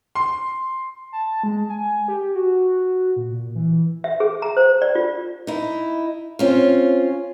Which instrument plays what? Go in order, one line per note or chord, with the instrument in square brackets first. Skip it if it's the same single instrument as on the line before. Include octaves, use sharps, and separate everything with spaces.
[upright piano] C6
[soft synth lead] A5
G#3
G#5
G4
F#4
A#2
A#2
E3
[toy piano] E5
G#4
A#5
C5
D5
F4
[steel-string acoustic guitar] D#4 E4
C4 C#4 F4